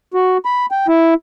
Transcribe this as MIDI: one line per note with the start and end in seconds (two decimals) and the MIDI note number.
0.14 0.37 66
0.45 0.66 83
0.71 0.87 79
0.88 1.14 64